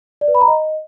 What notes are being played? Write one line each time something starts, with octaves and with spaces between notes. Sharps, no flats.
D5
B4
B5
A#5
D#5